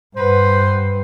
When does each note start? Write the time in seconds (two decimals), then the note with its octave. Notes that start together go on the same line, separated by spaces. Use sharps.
0.16 G2 B4 C5 F#5